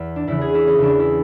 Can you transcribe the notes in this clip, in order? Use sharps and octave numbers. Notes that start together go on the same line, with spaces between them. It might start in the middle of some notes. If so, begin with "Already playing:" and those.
Already playing: E2
D4
E2 C#3 E3 E4
G#4
E4
C#4
E2 C#3 E3 D4
E4